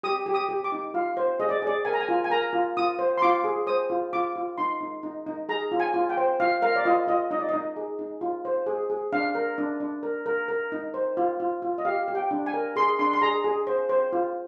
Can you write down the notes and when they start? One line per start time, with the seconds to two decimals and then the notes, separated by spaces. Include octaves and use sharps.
0.03 G4 D#6
0.26 G4
0.34 D#6
0.49 G4
0.64 D6
0.72 D#4
0.94 F4 F5
1.17 C5
1.40 G#4 D#5
1.49 D5
1.62 G#4 D5
1.85 A#4 G#5
1.94 A#5
2.00 G#5
2.09 F4
2.24 G#5
2.30 A#4 A#5
2.53 F4
2.77 F4 D#6
2.99 C5
3.18 C6
3.22 F4 D6
3.44 G#4
3.67 C5 D#6
3.90 F4
4.13 F4 D6
4.36 F4
4.58 D#4 C6
4.81 D#4
5.03 D#4
5.27 D#4
5.49 G#4 A#5
5.72 F4
5.80 G#5
5.94 F4
6.09 G5
6.17 C5
6.40 F4 F5
6.62 A#4 F5
6.76 D5
6.85 F4 D#5
7.07 F4 D#5
7.31 D#4 D#5
7.39 D5
7.49 D#4 D#5
7.76 G#4
7.99 D#4
8.21 F4
8.45 C5
8.66 G#4
8.90 G#4
9.13 D4 F5
9.35 A#4
9.58 D4
9.80 D4
10.03 A#4
10.26 A#4
10.48 A#4
10.72 D#4
10.94 C5
11.17 F4
11.40 F4
11.62 F4
11.78 D#5
11.85 G4 F5
12.08 G4
12.15 G5
12.31 D4
12.46 G#5
12.54 A#4
12.76 G#4 C6
12.99 D4 C6
13.13 C6
13.21 G#4 A#5
13.44 G#4
13.67 C5
13.89 C5
14.13 F4